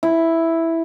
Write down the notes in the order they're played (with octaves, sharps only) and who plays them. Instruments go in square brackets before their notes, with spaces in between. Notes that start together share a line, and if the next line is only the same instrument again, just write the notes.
[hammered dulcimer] E4